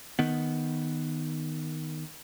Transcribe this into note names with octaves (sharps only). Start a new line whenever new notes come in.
D#3 B3